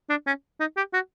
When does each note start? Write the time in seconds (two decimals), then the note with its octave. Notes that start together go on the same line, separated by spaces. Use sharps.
0.10 D4
0.27 C#4
0.60 D#4
0.77 G4
0.94 F#4